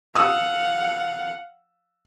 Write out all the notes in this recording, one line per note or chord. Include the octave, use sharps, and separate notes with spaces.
F5 F#5 D#6 E6